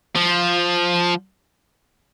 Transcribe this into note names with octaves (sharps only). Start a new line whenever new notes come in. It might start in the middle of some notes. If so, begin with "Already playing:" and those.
F3